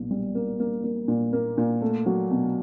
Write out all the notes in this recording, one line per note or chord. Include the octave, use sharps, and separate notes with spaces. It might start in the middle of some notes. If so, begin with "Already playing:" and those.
Already playing: B1 A#2
G3
A#3
A#3
A#3
A#2
A#3
A#2
A3
F#3
B2